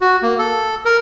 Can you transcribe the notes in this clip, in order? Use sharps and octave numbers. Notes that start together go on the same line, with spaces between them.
F#4
A#3
A4
A#4